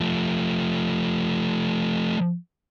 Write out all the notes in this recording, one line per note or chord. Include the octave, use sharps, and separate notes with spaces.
F3 A3